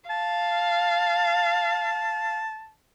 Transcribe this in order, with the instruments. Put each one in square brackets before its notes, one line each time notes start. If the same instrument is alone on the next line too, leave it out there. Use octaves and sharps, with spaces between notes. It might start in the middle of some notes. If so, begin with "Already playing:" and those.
[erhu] F5 [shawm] A5